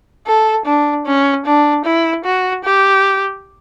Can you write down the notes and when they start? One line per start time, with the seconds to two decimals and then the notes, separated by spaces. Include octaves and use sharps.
0.27 A4
0.66 D4
1.06 C#4
1.46 D4
1.85 E4
2.25 F#4
2.64 G4